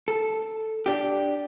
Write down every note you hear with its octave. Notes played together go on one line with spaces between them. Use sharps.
A4
D4 G4